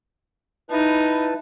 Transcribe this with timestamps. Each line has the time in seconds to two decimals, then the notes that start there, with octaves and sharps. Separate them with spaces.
0.71 D#4 E4 B4 A5